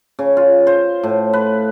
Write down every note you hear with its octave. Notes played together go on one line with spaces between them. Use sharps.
C#3
F4
C5
A2
B4